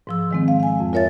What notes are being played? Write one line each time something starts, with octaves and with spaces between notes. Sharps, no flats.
G#2 F3 E6
D#3 G#3 C4
F5
F5 G#5
F2
F4 A#4 C#5 E5 A6